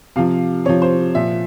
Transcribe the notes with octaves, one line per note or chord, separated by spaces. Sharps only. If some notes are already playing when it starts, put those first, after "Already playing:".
C3 F3 F5
C3 F3 C#5
C5
A#2 F3 E5